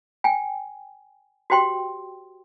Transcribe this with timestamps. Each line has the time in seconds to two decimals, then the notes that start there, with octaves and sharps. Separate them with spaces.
0.24 G5 G#5
1.50 F#4 G4 C5 G5 C6